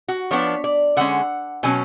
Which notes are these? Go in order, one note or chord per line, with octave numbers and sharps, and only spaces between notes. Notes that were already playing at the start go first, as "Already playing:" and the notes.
F#4
F3 B3 D4 C#5
D5
D3 G#3 C#4 F#5
B2 F#3 C#4 G#5